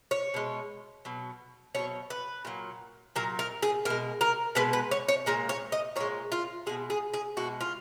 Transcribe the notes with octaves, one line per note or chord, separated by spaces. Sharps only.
C#5
B2 G#3
B2 F#3
B2 F#3 C#5
B4
A#2 F#3
A#2 F#3 A#4
A#4
G#4
B2 G#3 A#4
A#4
B2 G#3 B4
B4
C#5
C#5
A#2 G#3 A#4
C#5
D#5
A#2 G#3 C#5
F4
B2 G#3 G#4
G#4
G#4
B2 G#3 F#4
F4